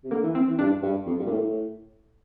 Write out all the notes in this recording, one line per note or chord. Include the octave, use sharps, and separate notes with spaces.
C3
D3 A#3
E3
C4
E3
G2 D4
G2
F2
G2
A#2
A2
A2